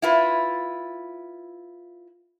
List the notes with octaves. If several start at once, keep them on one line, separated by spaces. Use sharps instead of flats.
E4 F4 B4